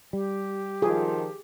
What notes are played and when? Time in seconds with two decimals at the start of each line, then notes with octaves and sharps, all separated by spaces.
0.13 G3 G4
0.82 D#3 F3 F4 G#4